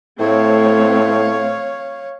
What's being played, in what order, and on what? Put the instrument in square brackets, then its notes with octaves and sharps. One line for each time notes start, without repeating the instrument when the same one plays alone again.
[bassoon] A2 [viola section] A3 C4 [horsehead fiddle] C#5 F5